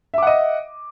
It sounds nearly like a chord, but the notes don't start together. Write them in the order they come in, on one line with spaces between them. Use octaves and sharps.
E5 D6 F#5 D#5